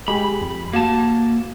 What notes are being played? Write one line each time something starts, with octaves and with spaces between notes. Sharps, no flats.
G#3 G4 G#4 B5
F2
A#3 F#4 A5